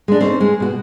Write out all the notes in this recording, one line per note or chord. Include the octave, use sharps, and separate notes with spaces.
G#3 D4
C4 C#4 D#4 A4 C5
G#3
B2 F#4